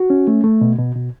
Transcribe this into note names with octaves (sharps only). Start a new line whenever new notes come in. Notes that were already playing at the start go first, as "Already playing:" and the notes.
Already playing: F#4
C#4
A3
A3
B2
B2
B2